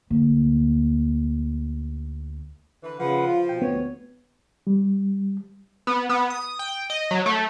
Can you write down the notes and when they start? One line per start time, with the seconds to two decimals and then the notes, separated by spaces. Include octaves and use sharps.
0.10 D2 A#3
2.83 D3 E3 B4
3.00 C#3 F3 B4 F#5
3.26 F4
3.49 B2 G5
3.62 D2 B3 C#5
4.67 G3
5.87 B3
6.09 B3
6.30 D#6
6.59 G5
6.90 D#5
7.11 F#3
7.26 A3